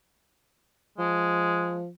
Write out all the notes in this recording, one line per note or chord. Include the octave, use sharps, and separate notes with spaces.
F3 G#3